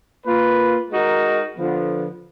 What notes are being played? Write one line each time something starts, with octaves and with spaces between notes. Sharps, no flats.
A#3 F4 B4
G#3 D#4 F#4 A#4
D3 F3 B3